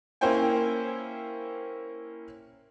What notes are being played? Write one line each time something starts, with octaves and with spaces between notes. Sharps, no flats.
A#3 C#4 E4 C5 G5 G#5